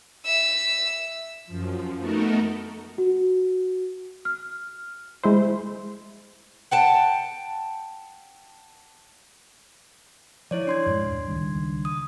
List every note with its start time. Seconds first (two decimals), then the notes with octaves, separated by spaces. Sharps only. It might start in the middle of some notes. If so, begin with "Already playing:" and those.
0.24 E5 E6
1.46 F#2 F3
1.99 A3 B3 D#4 F#4 A4 A#4
2.98 F#4
4.25 F6
5.23 G#3 E4 C5
6.71 F#5 G5 A5
10.51 F3 E4 C#5 D5
10.67 D4 C6 G#6
10.86 F#2 A2 G#3
11.06 D#2
11.27 C#2 D#3 G3
11.85 D#6